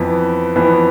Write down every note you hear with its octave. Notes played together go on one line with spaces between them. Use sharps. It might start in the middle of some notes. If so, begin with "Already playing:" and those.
Already playing: F2 E3 B3
F2 E3 B3